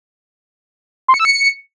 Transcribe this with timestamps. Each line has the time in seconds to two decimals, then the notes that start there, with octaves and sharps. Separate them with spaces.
1.08 C6
1.14 C#7
1.19 E6
1.25 C#7